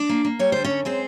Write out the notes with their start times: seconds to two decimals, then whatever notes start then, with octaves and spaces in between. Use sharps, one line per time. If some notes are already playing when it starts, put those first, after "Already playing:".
Already playing: D4 D5
0.09 A#3
0.25 A#3
0.39 G3 C#5
0.52 D3 C5
0.64 C#4 C#5
0.70 F#2
0.85 G#3 C4 C5